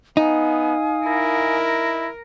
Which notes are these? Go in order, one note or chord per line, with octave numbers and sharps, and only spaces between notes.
B3 D#4 F5 G#5 D#6
E4 A#4